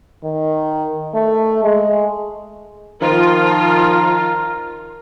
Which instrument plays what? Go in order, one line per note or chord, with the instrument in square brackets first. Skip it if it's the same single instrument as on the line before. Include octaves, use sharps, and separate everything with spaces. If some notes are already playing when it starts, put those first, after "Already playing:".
[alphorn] D#3
A3
G#3
[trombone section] D#3 F3 [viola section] F4 [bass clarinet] A#4